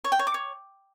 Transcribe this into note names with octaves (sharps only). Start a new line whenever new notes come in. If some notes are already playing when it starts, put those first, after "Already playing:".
C#5
G5
C#5
D6
C#5